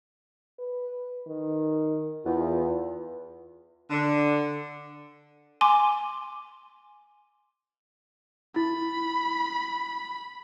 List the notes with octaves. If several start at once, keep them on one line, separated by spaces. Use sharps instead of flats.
B4
D#3
E2 F4
D3
G#5 C6 D6
E4 B5